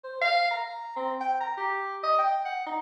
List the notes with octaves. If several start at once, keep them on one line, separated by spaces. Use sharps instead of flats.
C5
F5
A#5
C4
G5
A#5
G4
D#5
G5
F#5
D#4